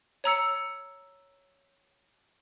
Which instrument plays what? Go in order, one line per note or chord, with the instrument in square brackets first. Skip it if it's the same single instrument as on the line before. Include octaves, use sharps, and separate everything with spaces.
[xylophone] C#5 A#5 E6 C#7